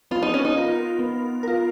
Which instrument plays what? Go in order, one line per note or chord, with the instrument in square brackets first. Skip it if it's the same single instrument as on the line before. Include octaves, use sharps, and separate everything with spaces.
[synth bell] B3 [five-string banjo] F4
[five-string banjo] D#4
C#4
D#4
[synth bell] F4 A#4
B3
F4 A#4